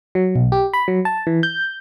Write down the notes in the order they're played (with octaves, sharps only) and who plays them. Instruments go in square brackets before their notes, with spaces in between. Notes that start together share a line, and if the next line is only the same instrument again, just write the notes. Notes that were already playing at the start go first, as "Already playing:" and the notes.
[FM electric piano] F#3
B1
G4
B5
F#3
A5
E3
G6